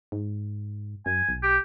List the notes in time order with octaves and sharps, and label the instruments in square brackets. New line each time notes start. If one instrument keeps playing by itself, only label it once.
[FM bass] G#2
[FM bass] F#2 [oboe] G#5
[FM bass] B1
[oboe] G4